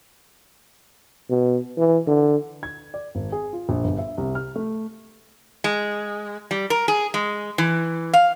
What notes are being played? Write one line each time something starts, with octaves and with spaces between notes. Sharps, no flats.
B2
E3
D3
G#6
D5
G#1
G#4
F4
A#1
G1
E5
C2
F6
A3
G#3
G3
A#4
G#4
G#3
E3
F5